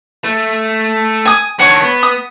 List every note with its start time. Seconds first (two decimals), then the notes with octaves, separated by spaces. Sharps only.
0.24 A3
1.25 G#5 D#6
1.59 D#3 D4 C#5 F#5
1.82 B3
2.03 D#6